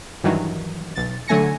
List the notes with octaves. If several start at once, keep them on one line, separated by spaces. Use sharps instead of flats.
G2 D#3 E3 F#3
B1 A6
D3 F#3 A3 G#5 A#6 C#7